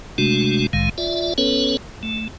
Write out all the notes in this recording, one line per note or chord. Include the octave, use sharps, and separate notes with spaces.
C3 G#3 A3 D4 F#4
C2 A2 D#3 G#3 F5
F4 D5 E5
B3 C#4 A4 B4 C#5
A3